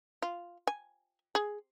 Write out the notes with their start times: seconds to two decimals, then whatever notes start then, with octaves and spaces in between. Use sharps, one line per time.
0.22 F4
0.67 G#5
1.35 G#4